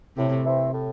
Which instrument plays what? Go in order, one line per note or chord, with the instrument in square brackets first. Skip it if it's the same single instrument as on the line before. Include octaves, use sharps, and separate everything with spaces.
[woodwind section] A2 [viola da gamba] C3
[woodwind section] E3 A3 C4 E4
A2